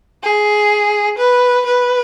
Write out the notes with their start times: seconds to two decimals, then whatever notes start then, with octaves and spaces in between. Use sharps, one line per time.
0.23 G#4
1.18 B4
1.66 B4